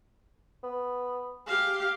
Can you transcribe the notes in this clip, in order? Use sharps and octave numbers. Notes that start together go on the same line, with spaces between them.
B3
G4 G#4 F5